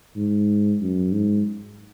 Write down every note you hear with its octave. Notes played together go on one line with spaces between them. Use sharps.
G#2
F#2
G#2